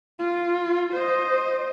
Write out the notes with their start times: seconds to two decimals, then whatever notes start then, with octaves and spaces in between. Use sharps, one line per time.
0.19 F4
0.94 C5 D#5